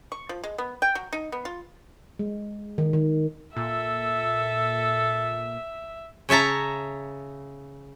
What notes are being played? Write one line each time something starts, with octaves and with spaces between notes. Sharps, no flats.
C#6
F3
G#3
B3
G5
F#3
D#4
B3
F4
G#3
D#3
D#3
A#2 A4 E5
C#3 C#5 E5 A5 A#5